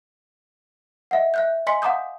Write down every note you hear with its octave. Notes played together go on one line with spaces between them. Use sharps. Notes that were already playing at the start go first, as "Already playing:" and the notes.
D#5 E5 F#5
E5 F#6 G6
D#5 G#5 C6 B6 C#7
F5 F#5 A#5 D6 D#6 G6